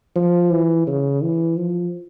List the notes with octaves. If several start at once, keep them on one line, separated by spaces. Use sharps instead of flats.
F3
E3
C#3
E3
F3